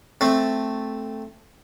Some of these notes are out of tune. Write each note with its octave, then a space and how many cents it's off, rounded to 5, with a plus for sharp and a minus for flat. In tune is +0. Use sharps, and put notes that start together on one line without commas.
A3 +0 C4 +0